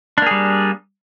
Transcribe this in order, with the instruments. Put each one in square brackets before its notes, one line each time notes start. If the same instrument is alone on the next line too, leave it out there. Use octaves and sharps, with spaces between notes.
[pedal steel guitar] D4
A#3
G#4
G3